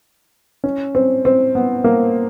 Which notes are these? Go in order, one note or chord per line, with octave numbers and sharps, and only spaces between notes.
C#4
C4
C4
B3
A#3